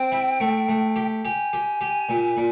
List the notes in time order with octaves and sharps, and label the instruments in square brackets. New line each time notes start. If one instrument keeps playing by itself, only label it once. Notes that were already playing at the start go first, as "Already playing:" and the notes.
Already playing: [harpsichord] C4 [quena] G5
[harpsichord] E4
A3
A3
G4
[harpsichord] G4 [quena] G#5
[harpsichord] G4
G4
A#2
A#2